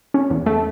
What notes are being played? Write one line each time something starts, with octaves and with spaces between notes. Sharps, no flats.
C#4
E2
A3